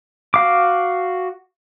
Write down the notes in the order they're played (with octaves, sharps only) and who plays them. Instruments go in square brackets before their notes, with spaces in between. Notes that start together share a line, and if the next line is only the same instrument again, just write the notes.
[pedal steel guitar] F#4 F5 D6